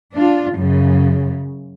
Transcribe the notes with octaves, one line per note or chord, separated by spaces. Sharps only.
D4 F4
F#2 C#3